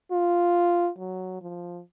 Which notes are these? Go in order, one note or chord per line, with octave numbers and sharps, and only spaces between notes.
F4
F#3
F3